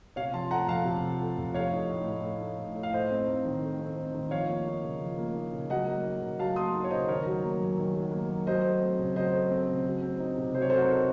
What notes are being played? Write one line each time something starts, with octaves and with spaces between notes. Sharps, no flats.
C3 C#5 F5
F3 A5 C6
A3 F#5 A#5
F2 F5 A5
C3
F3
A3
F2
A3 C#5 F5
D#4
A2
A2
A3
D#4
A2
A2
F5
A3 C5 D#5
C4
D#4
D#3
A3
C4
D#4
D#3
F3 C#5 F5
A#3
D#4
C#3
F3
A#3
D#4
C#3
F#3 D#5 F#5
A#3
D#4
C#3
F#3 F5 A5
A#3 C6 D#6
D#4
C#5
C#3 C5 D#5
D#3 A#4 C#5
F#3
A#3
F#2
D#3
F#3
A#3
F#2
F#3 C5 D#5
A3
C4
C#3
F#3 C5 D#5
A3
C4
C#3
F#3
C4
D#4
C3
F#3 C5
C#5
C4 A4 C5
F#4 A#4
D#4